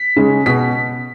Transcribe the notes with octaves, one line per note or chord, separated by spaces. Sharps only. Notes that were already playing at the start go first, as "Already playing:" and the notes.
Already playing: B6
C#3 G#3
B2 B6